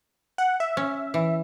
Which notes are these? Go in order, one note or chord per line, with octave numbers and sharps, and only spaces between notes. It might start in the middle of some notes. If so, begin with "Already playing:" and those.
F#5
E5
C#4
E3